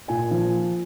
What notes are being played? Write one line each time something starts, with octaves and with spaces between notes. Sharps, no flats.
A#2 G#5
F3